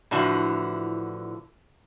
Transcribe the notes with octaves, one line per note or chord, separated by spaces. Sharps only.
A2 D3 E3 F3 F#4